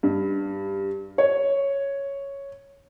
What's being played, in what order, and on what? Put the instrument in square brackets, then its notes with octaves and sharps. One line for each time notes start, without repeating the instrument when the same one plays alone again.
[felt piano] G2
C#5